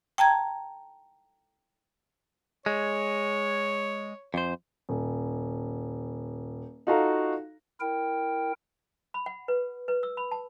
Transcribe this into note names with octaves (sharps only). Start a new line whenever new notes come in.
G5 A5 A#5 G#6
G#3 C#5
F2 C5
D#1
D#4 F4 F#4 A4 F5 A#5
E4 A#4 G5
B5
F#5
B4
B4
E6
B5
A5